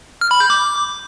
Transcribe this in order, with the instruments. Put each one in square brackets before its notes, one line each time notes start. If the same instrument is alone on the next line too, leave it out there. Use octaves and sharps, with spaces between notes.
[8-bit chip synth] F6
B5
G6
D6